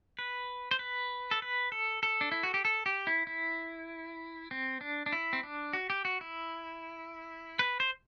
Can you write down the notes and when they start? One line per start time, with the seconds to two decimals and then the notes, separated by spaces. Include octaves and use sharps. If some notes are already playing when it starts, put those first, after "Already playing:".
0.19 B4
0.71 C5
0.79 B4
1.31 A4
1.42 B4
1.72 A4
2.03 A4
2.21 D4
2.32 E4
2.43 F#4
2.54 G4
2.65 A4
2.86 G4
3.07 E4
3.27 E4
4.51 C4
4.81 D4
5.06 D4
5.12 E4
5.33 C4
5.43 D4
5.73 F#4
5.90 G4
6.05 F#4
6.21 E4
7.59 B4
7.80 C5